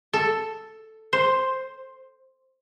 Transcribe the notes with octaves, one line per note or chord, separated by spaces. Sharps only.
A4
C5